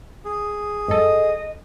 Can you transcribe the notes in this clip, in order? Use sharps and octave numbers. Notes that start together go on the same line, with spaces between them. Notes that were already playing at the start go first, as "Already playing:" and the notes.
G#4
G#1 F#2 A4 D#5